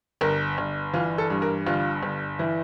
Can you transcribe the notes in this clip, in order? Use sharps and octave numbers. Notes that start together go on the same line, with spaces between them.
G1 A#4
G1
E3 F4
A4
G2
A#4
G1 F4
G1
E3 E4